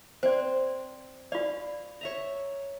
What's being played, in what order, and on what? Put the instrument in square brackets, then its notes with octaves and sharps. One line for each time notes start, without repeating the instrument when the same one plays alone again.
[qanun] C4 [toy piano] C5 D5
[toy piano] F4 D5 [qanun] F5
[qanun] C#5 E5 A#5